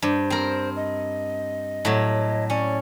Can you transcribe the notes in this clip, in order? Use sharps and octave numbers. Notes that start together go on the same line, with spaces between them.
G2 C5
C4 A#4
D#5
A2 F#3
C#4 D5